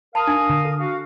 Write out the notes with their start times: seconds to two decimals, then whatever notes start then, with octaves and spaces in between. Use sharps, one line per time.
0.15 A#4 F5 A5 B5 D#6
0.27 D4
0.50 D3
0.65 A4
0.79 F#4 F5